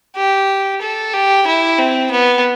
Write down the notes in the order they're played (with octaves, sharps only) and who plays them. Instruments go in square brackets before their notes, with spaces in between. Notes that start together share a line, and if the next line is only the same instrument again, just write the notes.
[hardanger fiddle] G4
A4
G4
E4
C4
B3